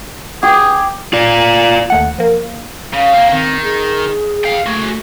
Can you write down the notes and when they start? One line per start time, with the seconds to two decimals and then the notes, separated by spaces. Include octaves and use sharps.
0.43 G4 G#4
1.13 F4 D5
1.90 D#2 A3 F#5
2.18 F3 A#3
2.93 C#3 F5
3.14 A#3 C4
3.32 D#3 C4
3.63 G#4
4.44 F5 G5
4.66 A3 F#4 G#4